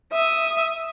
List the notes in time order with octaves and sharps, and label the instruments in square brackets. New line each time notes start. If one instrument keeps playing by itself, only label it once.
[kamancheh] E5 D#6